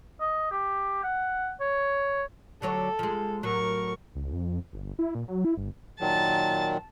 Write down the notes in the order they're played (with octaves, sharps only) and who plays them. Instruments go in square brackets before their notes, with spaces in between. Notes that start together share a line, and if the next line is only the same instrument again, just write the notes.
[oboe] D#5
G4
F#5
C#5
[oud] D3 F#3 C#5 [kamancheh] A4
[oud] F3 G#3
[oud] A2 F#3 [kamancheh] A#4 C#6
[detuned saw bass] C#2
F2
G1
E4
A#2
F#3
E4
G1
[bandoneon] A#2 D#3 F#3 [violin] A5 A6